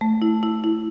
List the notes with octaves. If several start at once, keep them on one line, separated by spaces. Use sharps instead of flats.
A3
E4
E4
E4